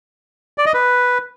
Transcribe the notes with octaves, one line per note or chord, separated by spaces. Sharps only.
D5
D#5
B4